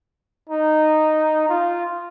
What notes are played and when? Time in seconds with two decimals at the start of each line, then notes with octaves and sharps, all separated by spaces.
0.50 D#4
1.49 F4